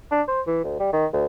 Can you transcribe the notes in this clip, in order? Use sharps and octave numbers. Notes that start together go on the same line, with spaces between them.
D4
C5
E3
D2
G3
D#3
D2